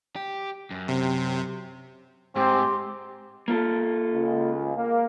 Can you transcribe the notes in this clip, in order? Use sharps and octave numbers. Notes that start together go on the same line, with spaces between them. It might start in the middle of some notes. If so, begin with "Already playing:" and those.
G4
F#2
C3
G#2 C4 G4
A#3 F4 A4
C#2
A#3